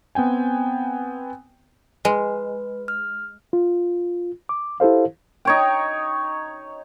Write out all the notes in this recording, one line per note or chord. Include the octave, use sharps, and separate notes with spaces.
B3 C4 G5 G#5
G#3 B4
F6
F4
D6
E4 G4 A4 C5 F5
D#4 C#5 G5